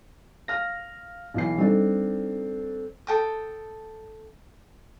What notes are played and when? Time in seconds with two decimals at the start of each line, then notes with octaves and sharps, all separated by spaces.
0.48 F5 F6 A#6
1.34 B1 E3 C7
1.58 G3 C4 D4 D#4 A4
3.07 A4 G5 D#6